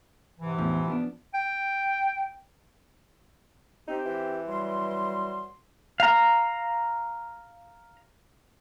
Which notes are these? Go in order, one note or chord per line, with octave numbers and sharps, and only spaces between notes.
G#2 C3 E3
E2 A2 F3
F3 B3 D4
G5
C4 D#4 G4
E3
F#3 G3 C6
F5 A#5